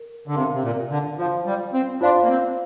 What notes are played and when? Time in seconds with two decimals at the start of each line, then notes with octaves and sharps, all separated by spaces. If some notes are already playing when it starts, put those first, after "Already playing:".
Already playing: A#4
0.28 D3
0.35 C3 A#4 F5 C6
0.53 C3
0.63 A#2
0.90 D3
1.18 F3 F4 C5 F5 C6
1.46 G3
1.73 C4
2.01 D4 F4 C5 F5 C6
2.24 A#3
2.29 C4